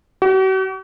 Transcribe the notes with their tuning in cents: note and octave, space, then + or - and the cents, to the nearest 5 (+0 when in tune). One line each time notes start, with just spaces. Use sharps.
F#4 +45